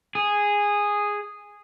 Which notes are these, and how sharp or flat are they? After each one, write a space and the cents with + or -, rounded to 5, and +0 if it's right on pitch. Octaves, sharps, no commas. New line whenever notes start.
G#4 -10